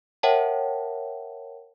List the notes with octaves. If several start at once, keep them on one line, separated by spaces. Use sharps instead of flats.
A#4 C#5 E5 F#5 G5 A5